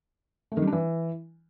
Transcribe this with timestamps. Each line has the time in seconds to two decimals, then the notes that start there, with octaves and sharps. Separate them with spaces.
0.52 A3
0.57 D#3
0.62 G3
0.67 D4
0.73 E3